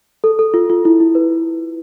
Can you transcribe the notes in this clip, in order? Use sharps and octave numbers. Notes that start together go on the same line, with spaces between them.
A4
A4
F4
F4
E4
E4
B4